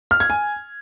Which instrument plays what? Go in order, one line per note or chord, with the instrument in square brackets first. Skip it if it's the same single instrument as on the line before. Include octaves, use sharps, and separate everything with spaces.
[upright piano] F6
G#6
G#5